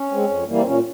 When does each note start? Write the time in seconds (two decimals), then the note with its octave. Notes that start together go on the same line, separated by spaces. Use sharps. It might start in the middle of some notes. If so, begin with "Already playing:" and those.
Already playing: C#4
0.11 G#3 C4
0.29 F2
0.47 E3 G3 A#3
0.56 C4
0.65 A#2 C#4